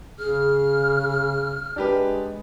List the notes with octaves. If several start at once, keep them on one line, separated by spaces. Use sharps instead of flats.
C#3 G#4 F6
G#3 D4 G4 B4